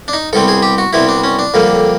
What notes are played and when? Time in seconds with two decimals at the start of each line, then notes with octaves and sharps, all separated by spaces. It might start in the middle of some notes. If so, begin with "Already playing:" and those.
0.08 D4
0.13 D#4
0.33 C2 B2 G3 C4 A4
0.48 G#4
0.63 G4
0.78 F#4
0.93 C2 B2 G3 C4 E4
1.09 D4
1.24 C#4
1.39 D4
1.54 F2 D3 G3 A#3